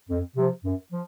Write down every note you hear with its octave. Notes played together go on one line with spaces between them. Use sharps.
F2
C3 F3
F#2
F3